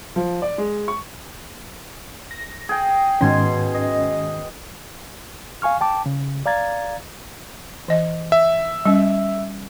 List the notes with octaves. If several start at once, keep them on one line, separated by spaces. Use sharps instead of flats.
F3
D5
G#3
C#6
A#6
G#4 G5
G#2 B2 D#3 C#4 G#5 C6
D#5
F5 G#5 C#6 F6
G5 A5 D6
C#3
D5 F5 A#5 G#6 A6
E3 D#5
E5
G3 C#4